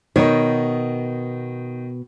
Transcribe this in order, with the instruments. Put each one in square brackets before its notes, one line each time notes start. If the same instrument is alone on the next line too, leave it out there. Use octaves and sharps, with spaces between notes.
[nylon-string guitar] B2 B3 C#5 [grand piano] D#3 D#4